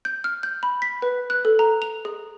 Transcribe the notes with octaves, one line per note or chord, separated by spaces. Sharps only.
G6
F6
G6
B5
B6
B4
F#6
A4
A#5
F7
G#4